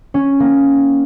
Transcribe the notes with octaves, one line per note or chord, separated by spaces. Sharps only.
C#4
A#3